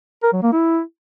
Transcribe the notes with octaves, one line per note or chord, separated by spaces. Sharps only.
A#4
F#3
A#3
E4